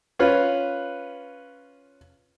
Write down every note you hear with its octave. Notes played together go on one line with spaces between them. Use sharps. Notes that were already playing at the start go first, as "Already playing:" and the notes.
C#4 F4 B4